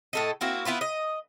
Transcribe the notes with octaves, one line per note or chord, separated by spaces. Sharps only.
A2 A4 D#5
A#3 C4 E4 F#4
B3 E4 F4 B4
D#5